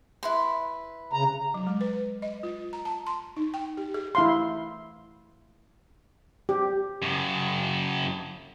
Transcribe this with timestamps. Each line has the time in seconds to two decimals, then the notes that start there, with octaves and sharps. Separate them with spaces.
0.23 E4 B4 C6
1.13 C#3 A#5
1.54 F#3
1.67 G#3
1.81 B4
2.22 D#5
2.43 F4
2.73 A#5
2.85 A5
3.07 C6
3.37 D#4
3.54 G5
3.77 G4
3.94 G#4
4.15 E4 F5 C6
6.49 G4
7.02 F#2 C#3